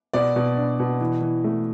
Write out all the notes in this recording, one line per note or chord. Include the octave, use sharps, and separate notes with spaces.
B2 D5
B2
D4
B2
E3
E3
A3